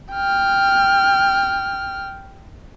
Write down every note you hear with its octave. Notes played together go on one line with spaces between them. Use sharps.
G5 F6